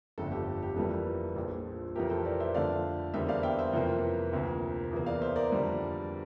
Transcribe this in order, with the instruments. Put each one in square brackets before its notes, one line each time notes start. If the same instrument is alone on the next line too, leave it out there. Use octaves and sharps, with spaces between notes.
[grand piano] G1 F2 D3 A3 A4
G4
G4
F2 E3 G3 A#3 A4
A#1 A#2 F3
F2 E3 A3 G4 A#4
A4 C5
A#4 D5
C5 E5
F2 D3 A3 D5 F5
E2 D3 G3 A#3 C5 E5
D5 F5
E5 G5
C5 E5
F2 C3 E3 A#3
D2 C3 F3 A#3
E2 E3 A#3
D5 F5
C5 E5
A#4 D5
F2 D3 G3 A#3